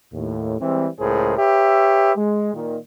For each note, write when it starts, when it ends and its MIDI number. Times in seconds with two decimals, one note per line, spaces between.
0.13 0.56 39
0.13 0.56 45
0.61 0.88 52
0.61 0.88 55
0.61 0.88 56
0.61 0.88 60
1.00 1.38 37
1.00 1.38 45
1.00 1.38 68
1.00 1.38 70
1.00 1.38 72
1.38 2.13 67
1.38 2.13 71
1.38 2.13 73
1.38 2.13 76
2.17 2.54 56
2.54 2.78 46
2.54 2.78 51